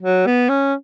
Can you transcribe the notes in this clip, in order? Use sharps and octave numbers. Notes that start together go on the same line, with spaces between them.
F#3
B3
C#4